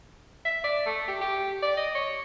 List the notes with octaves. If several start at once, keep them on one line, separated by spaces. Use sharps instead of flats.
E5
D5
A3
G4
G4
D5
D#5
C#5